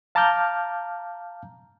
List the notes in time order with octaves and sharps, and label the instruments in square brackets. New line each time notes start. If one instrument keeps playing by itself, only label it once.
[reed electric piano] F5 A5 A#5 D6 F6 G6